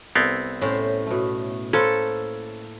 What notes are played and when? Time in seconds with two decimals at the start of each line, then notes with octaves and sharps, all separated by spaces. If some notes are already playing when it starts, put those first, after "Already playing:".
0.15 C2 B3 C4 A4
0.62 A2 C#4 C5
1.07 B2 A3
1.73 A#3 C#4 A4 B4 C5